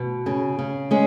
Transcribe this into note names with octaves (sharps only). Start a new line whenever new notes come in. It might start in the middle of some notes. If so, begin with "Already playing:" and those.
Already playing: B2
C#3
C#3
G#3 C#4